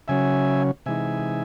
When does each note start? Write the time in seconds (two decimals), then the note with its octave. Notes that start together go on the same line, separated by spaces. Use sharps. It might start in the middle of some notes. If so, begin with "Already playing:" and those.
0.08 C#3 F#3 C#4 E5 G#5
0.86 C3 E3 G#3 D#4 E5 G#5